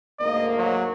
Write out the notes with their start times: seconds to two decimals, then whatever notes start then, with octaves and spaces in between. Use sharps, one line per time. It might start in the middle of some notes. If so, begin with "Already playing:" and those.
0.19 D2 G#2 A#3 D#5
0.58 F#3